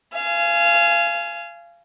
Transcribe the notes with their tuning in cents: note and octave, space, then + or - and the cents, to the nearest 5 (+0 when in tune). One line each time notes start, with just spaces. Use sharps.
F5 -25 G#5 +15